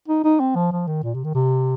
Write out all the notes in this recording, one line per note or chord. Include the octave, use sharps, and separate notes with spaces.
D#4
D#4
C4
F3
F3
D#3
A#2
C3
D#3
C3